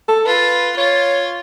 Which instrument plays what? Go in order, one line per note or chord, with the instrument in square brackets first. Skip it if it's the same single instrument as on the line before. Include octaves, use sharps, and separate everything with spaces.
[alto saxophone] A4
[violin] F4 [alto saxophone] B4
[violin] F4 [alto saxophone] C#5